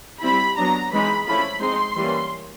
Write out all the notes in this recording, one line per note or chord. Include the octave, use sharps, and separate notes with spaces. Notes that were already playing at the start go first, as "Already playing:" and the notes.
G3 C4 E4 B5
F#3 B3 D4 A#5
E3 G#3 C4 D#4 B5
F3 A3 C#4 E4 B5
G#3 C4 D#4 C6
E3 G3 A#3 C#4